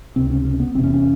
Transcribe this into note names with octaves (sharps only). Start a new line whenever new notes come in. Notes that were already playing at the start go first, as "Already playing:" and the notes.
C#2 C3 C4
C#4
C#4
B3
F1 E2 C3 C4
C#4
C#4